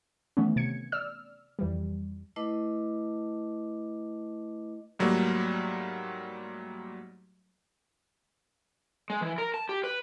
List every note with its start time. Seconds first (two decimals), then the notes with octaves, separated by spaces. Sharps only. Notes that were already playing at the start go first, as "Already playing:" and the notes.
0.37 D#3 E3 A3 B3 C#4
0.56 C3 G#6 C#7
0.92 D5 E6 F6
1.59 F2 E3 G3
2.36 A3 E4 B4 D#5 A5 D6
4.99 G#2 F#3 G3 A3 A#3
9.10 G#3
9.21 E3
9.38 A#4
9.54 A5
9.69 G4
9.84 B4